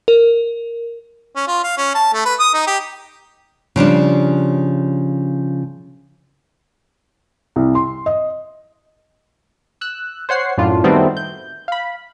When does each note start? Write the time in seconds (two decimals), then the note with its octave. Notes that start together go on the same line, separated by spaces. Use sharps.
0.08 A#4
1.36 C#4
1.48 F4
1.64 F5
1.78 C#4
1.95 A5
2.13 A3
2.26 B4
2.39 D#6
2.54 D#4
2.67 G4
3.76 C#3 F3 G3 D4
7.56 C2
7.75 C6
8.06 D#5
9.81 E6 F#6
10.29 C5 C#5 F#5 C7
10.57 F#2 A2 D4 F4
10.84 D#3 G3 A3 B3 C4 F#4
11.17 G6
11.68 F5 B5